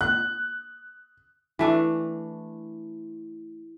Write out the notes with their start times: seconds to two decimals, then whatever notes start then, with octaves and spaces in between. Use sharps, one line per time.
0.01 F#6
1.59 E3 A3 D4